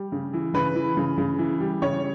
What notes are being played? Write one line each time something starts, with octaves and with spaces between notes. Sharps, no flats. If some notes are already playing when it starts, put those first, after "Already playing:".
Already playing: G3
C#3
E3
C#3 B4
E3
C#3
C#3
E3
G3
C#3 C#5